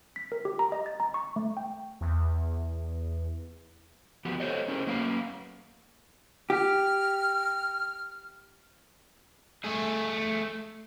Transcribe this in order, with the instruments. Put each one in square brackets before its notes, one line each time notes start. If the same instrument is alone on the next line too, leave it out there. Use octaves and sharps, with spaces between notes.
[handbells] B6
A#4
G4
A#5
D#5
A6
A#5
C#6
A3
G5
[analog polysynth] E2
[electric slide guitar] E3 F3 B3 F#4 G4
G4 A4 C5 C#5 D#5
C#4 E4 G#4 A#4 C5
F#3 A#3 C#4 B4 F5
[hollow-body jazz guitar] G4 [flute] F6
[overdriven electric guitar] A3 G#4